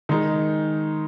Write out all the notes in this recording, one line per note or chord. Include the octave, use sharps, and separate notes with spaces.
D#3 G#3 D#4